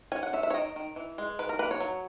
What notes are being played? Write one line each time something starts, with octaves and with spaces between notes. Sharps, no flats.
C#4 G#5
F#5
C#4 E5
E5
C#5
D#3 D#5
D#3
E3
G#3
D#3 B4
A#4
A#3 B4
C#5
F#3